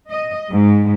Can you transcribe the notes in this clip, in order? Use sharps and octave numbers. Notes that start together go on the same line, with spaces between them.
D#5
G#2